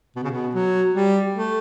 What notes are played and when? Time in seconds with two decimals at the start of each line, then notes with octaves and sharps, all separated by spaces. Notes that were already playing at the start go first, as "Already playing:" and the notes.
0.16 B2
0.24 C#3
0.31 B2
0.55 F#3
0.95 G3
1.35 A3